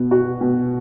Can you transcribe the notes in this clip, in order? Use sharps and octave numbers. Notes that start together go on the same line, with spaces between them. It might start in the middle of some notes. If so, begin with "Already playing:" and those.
Already playing: B2 B3
F#4
B2